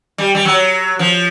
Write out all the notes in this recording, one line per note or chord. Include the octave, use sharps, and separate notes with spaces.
G3
G3
F#3
F3